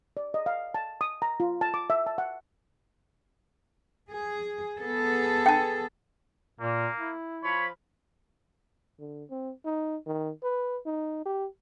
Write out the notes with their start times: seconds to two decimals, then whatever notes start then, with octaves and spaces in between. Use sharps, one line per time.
0.17 D5
0.34 D#5
0.46 F5
0.74 A5
1.01 D#6
1.22 A#5
1.40 F4
1.61 A5
1.74 D6
1.90 E5
2.06 A5
2.18 F#5
4.10 G#4
4.78 B3 G#4 A4
5.46 G5 A5
6.60 A#2 A#3
6.98 E4
7.44 F3 C#5 B5
9.00 D3
9.30 C4
9.65 D#4
10.06 D#3
10.43 B4
10.86 D#4
11.26 G4